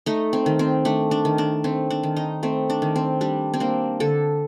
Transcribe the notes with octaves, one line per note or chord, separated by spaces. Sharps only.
A3 D#4
C4
D#3
C4
A3 D4
D4
D#3
D4
A3 C4
D4
D#3
D#4
A3 C4
D4
D#3
C4
G3 D4
C4
A#3 D4
D3 A4